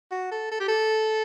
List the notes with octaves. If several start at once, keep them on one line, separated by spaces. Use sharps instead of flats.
F#4
A4
A4
G4
A4